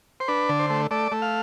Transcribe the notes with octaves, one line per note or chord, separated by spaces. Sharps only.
C5
D4 B4
D3
C5
A3
A3 D5
A3
F5